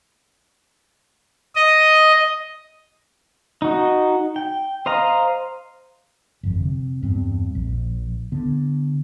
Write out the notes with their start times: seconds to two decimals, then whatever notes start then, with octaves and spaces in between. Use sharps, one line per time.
1.55 D#5
3.62 D#4 F#4
4.36 G5
4.86 C5 D#5 F5 A#5
6.43 G1 F2
6.60 C3
7.03 E2 G2 C4
7.55 A#1
8.32 D3 B3